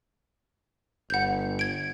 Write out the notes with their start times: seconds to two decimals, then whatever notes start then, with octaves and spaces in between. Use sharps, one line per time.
1.10 G1 F#5 G6
1.59 G#6 D7